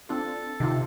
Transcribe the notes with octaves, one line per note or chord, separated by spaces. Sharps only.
C4 D4 F4 A4
C3 D#3 F4